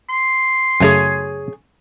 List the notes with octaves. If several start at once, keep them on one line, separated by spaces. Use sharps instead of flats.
C6
F#2 C#3 A3 G#4 C#5 G#5